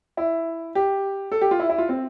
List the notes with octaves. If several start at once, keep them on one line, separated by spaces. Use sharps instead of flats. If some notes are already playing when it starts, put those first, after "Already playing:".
E4
G4
A4
G4
F4
E4
E4
F4
C4